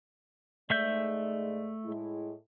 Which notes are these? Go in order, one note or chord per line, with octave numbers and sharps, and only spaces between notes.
G#2 G#3 A3 D5 E5 G6
A2 G#3 E4